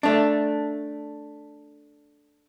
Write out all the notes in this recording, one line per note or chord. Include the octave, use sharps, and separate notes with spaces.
A3 D4